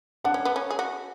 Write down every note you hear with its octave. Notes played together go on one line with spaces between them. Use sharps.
D4 F#5
C#4
B3
C#4
G#4
F#4